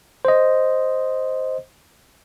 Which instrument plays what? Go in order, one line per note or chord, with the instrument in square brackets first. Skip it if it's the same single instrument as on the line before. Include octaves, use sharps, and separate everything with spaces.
[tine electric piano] C5 D#5